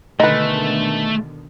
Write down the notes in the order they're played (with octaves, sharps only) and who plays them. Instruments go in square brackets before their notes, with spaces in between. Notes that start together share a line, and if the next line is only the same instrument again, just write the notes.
[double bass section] B2 D3 D#3 [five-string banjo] G#3 B4 [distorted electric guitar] A3 [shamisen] D#4